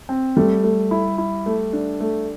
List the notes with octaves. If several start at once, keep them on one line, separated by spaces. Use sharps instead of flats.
C4
G3 A3
A3
E4
E4
A3
D4
A3